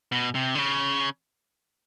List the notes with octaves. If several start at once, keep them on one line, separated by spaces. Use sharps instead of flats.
B2
C3
D3
C#3